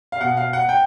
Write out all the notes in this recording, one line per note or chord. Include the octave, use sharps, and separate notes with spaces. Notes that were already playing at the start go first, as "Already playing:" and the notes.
F5
B2 F#5
F5
F#5
G5